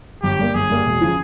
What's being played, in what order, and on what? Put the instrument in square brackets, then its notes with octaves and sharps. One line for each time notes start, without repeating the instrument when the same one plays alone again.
[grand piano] G1 [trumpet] G4
[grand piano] G2 G3 A#3
[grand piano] G1 [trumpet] G#4
[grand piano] G2 G3 A#3
E1
C#3 F3